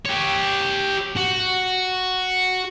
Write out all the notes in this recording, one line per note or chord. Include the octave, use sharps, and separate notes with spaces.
G4 C#5
F#4